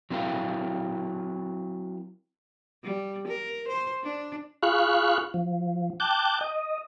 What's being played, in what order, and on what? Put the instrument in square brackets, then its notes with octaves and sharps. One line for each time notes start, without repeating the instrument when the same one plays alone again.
[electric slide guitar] F#3 C4 E4 A#4 F5
[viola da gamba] G3
A#4
C5
D4
[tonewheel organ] F4 G#4 F5 B5 C#6 F#6
F3
G5 A5 D6 F#6 G6
D#5